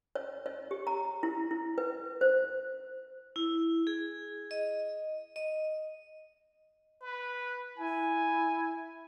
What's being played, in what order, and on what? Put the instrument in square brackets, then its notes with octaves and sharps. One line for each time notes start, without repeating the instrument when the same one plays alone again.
[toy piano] C#5
C#5
G4
A#5
E4
E4
B4
C5
[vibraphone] E4
G#4
D#5
D#5
[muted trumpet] B4
[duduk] E4 [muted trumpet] G#5